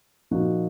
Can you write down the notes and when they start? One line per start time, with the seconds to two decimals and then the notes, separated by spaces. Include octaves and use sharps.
0.31 A#2 F3 A#3 D#4 F#4